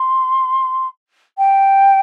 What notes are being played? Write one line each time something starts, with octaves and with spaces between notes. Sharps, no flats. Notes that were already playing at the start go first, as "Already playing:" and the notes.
Already playing: C6
G5